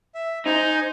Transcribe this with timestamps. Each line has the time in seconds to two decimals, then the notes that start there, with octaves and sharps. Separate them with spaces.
0.15 E5
0.46 D#4 C5 G#5